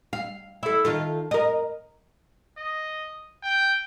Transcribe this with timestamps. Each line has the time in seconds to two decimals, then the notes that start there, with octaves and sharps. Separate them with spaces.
0.13 F5
0.63 E4 A4
0.85 D#3 F4 A4
1.31 A#4 D#5
2.58 D#5
3.43 G5